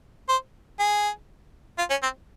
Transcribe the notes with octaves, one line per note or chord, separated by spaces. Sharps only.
C5
G#4
F4
C#4
C4